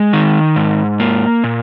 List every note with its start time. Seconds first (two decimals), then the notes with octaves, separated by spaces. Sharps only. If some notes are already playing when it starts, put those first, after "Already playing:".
Already playing: G#3
0.13 D#3
0.56 G#2
1.00 A#3
1.44 A#2